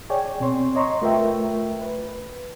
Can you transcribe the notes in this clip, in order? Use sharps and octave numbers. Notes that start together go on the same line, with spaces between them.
G#4 C#5 D5 G5 G#5
B2 C4 C#5 C6
C#5 D#5 A#5 C6 C#6
A3 F4 A#4 B4 E5 G5
B4